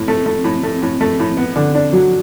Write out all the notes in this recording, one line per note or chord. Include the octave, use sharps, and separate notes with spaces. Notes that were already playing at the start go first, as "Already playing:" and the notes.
Already playing: A2
A3
A3
A2
A3
A2
A3
A2
B3
D3
D4
F#3